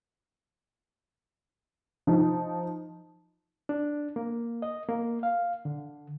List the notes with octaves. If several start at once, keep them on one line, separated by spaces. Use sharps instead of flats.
F3 D#4
D4
A#3
D#5
A#3
F5
D3